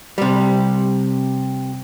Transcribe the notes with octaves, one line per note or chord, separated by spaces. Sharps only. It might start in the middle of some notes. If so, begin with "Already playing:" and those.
C3 G3